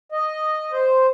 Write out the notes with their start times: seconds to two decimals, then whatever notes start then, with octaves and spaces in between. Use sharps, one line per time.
0.12 D#5
0.72 C5